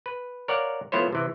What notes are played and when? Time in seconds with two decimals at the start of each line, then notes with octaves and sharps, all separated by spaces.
0.06 B4
0.48 A#4 C#5 D5 F5 F#5
0.92 F3 A3 B3 E4 C5 C#5
1.13 C3 E3